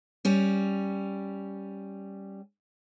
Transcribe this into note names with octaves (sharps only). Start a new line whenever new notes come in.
G3 C#4